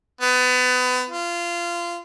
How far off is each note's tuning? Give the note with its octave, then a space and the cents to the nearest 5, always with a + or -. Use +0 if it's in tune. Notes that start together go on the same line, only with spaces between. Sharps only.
B3 +30
F4 -20